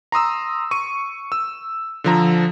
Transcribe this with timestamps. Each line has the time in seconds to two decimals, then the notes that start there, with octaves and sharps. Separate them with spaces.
0.12 A#5 C6 D#6 E6
0.71 C#6 D#7
1.32 E6
2.04 D3 F3 A#5